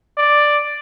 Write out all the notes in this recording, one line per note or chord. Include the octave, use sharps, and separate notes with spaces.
D5